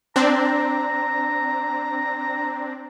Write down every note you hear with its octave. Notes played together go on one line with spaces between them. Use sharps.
C4 D4 A#5